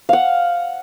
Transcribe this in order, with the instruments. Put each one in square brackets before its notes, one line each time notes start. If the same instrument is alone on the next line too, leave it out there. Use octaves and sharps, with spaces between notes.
[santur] F5 F#5